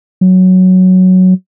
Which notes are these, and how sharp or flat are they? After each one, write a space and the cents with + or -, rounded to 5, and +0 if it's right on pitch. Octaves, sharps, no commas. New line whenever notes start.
F#3 +0